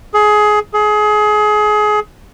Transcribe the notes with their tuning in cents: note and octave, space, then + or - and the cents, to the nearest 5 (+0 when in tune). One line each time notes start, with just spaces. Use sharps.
G#4 +20
G#4 +25